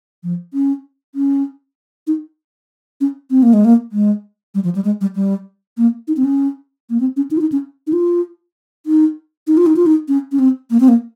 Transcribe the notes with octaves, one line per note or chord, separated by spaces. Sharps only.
F3
C#4
C#4
D#4
C#4
C4
A#3
G#3
A#3
G#3
G3
F3
G3
G#3
G3
G3
A#3
D#4
C4
C#4
A#3
C4
C#4
D#4
F4
D#4
C#4
D#4
F4
D#4
D#4
F4
D#4
F4
D#4
C#4
C#4
C4
A#3
C4
A#3